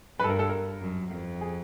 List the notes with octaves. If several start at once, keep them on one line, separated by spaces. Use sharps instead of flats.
G2 B4
A4
A#4
A4
A#4
F#2
F2
G#4